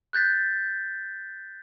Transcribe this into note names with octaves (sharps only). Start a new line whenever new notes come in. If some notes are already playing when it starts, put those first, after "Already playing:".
F#6 G6 A6 B6